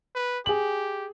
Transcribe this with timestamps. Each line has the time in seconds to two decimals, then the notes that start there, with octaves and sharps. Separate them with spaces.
0.15 B4
0.46 G4 G#4 F#7